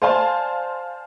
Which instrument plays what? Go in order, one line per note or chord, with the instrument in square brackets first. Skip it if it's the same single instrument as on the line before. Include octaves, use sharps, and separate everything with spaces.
[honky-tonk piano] C5 D5 F5 G#5 A5 C6